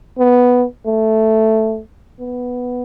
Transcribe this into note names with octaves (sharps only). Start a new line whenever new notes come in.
B3
A3
B3